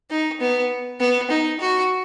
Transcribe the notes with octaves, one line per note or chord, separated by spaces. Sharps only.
D#4
B3
B3
D#4
F#4